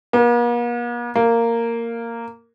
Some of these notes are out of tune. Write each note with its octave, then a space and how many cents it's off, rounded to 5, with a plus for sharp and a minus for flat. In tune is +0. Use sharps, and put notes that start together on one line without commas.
A#3 +45
A#3 -10